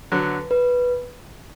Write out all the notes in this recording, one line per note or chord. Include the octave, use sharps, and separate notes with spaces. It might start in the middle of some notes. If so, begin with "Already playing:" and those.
D3 F#3 B4
B4